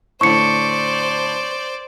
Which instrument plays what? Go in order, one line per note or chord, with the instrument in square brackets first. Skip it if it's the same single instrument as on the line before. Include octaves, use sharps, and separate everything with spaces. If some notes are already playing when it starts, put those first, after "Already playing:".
[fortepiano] A2 D3 [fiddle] C5 D5 [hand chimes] C#6 C#7